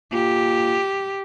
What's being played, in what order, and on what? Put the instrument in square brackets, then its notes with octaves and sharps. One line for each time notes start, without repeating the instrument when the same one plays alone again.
[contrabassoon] A#2 [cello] G4